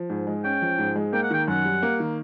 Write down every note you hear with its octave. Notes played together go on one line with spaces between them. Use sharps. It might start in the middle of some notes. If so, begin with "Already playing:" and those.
Already playing: F3
G#2
G#3
C#4 G5
F3
G#2
G#3
A#3 G5
F#5
D#3 G5
F#2 F#5
G3
A#3
D#3